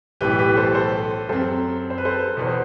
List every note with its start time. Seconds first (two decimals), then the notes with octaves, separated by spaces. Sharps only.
0.21 B1 A2 E3 G4 B4
0.39 G4 B4
0.56 A4 C5
0.74 A4 C5
1.29 F#2 F#3 C4 A4 C5
1.90 C5
1.98 B4
2.05 A4 C5
2.37 E2 B2 B4
2.47 C5